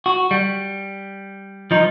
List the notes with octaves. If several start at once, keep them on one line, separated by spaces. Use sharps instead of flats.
F#4
G3
F3 D#4